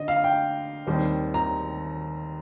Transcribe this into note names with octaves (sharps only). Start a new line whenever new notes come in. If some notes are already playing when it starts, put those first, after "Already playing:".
Already playing: D3 D#5
F5
G5
D#2 D#3 G3 C4
A#5